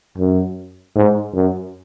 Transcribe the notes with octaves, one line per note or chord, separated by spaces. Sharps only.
F#2
G#2
F#2